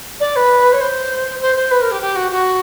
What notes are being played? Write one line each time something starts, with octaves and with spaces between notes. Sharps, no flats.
D5
B4
C#5
C5
C5
C5
B4
A#4
G4
G4
F#4
F#4